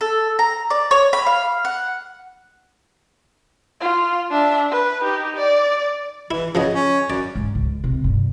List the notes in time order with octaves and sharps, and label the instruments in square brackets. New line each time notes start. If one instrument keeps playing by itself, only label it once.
[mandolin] A4
A#5
D5
C#5
B5
F5
F#5
[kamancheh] F4
D4 E5
B4
D#4 G4
D5
[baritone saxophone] E3 [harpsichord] E4
[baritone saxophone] C#3 [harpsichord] F3 F#4 D#5
[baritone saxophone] C#4
[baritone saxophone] F#2 [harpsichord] D5
[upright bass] G#2
C#2
C3
E2 G2